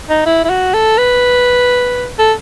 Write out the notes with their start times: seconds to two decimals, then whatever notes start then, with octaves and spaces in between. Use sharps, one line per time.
0.10 D#4
0.26 E4
0.45 E4
0.50 F#4
0.74 A4
0.98 B4
2.19 A4